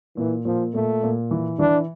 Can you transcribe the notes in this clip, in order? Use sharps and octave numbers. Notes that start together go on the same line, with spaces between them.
A#2 E3
A#2 F3
A#2 A3
A#2
E3
E3 D4